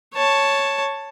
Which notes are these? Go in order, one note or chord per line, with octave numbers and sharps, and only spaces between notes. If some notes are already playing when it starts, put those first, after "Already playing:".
C#5 A5